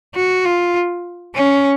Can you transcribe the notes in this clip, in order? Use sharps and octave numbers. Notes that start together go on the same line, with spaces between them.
F#4
F4
C#4